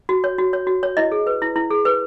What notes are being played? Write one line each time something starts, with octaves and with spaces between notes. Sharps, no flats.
F#4
C#5
F#4
C#5
F#4
C#5
E4 D#5
G#4
B4
E4
E4
G#4
B4